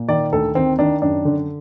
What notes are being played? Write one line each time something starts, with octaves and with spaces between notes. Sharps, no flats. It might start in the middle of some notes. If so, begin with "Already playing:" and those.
Already playing: A#2
D#3 D5
D2 A4
D#3 C4
D#3 D4
F#2 D4
D3